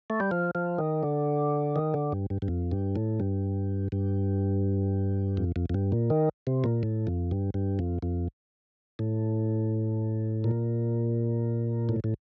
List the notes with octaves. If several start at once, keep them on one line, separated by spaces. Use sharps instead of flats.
A3
G3
F3
F3
D#3
D3
D#3
D3
G2
G2
G2
F2
G2
A2
G2
G2
F2
F2
F2
G2
A#2
D#3
C3
A#2
A2
F2
G2
G2
F2
F2
A2
A#2
A2
A2